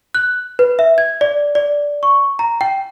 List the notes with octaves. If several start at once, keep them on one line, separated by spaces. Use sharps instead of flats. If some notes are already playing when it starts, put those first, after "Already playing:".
F#6
B4
E5
G#6
D5
D5
C#6
A#5
G5